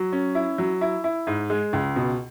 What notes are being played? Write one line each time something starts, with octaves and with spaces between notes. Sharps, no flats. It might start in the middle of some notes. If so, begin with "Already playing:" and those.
Already playing: F#3
C#4
E4
F#3
E4
E4
G#2
G#3
C#2
B2